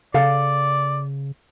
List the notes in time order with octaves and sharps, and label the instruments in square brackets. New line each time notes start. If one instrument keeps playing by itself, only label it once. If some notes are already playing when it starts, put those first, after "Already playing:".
[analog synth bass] C#3 [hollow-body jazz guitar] A4 F5 [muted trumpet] D5